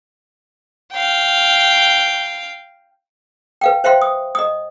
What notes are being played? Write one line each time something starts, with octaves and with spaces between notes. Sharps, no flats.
F5 G5
B4 F5 G5
C5 E5 F5 G5 C6
D#6
D#5 D#6